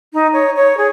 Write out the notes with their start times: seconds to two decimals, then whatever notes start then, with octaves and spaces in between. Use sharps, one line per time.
0.14 D#4
0.33 C#5
0.56 C#5
0.77 G#4